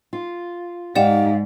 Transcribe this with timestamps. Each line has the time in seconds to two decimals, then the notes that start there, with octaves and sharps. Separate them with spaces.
0.13 F4
0.95 G#2 D#4 G4 D5 F5 F#5 E7